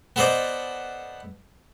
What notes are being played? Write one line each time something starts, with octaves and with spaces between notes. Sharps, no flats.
B3 A4 B4 C5 D5 D#5